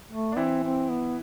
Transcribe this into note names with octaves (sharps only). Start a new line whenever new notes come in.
A3
D4
E3 C4 E4
C4
B3